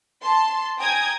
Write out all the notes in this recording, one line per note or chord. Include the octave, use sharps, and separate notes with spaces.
A5 C6
G5 G#5 A#5 D#6 G#6